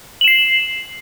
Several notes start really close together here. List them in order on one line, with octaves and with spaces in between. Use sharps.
F#7 E7 C7